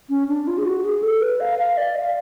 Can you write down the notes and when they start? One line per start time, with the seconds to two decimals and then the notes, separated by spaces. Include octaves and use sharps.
0.09 C#4
0.28 D4
0.47 F4
0.58 G#4
0.65 F#4
0.84 G#4
1.03 A4
1.21 B4
1.40 F5
1.58 F5
1.77 D5
1.96 F5